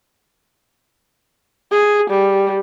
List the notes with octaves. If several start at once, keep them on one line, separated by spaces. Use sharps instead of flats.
G#4
G3